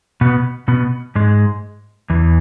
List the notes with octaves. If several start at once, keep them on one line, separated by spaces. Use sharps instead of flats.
B2 B3
B2 B3
G#2 G#3
E2 E3